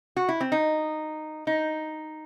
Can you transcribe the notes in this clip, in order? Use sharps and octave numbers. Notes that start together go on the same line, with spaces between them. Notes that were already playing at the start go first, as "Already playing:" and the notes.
F#4
E4
C4
D#4
D#4